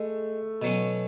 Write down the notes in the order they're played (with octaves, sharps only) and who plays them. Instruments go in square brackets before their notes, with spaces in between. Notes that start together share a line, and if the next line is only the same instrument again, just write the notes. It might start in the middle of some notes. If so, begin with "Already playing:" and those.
Already playing: [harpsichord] G#3 [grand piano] A3
[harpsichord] B2 F#3 C#4